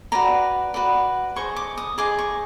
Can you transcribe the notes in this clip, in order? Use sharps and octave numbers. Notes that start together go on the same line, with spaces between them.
F#4 B4 D5 A#5
F#4 B4 D5
G#4 C5 D#5 C#6
D6
D#6
G#4 C5 D#5 D6
C#6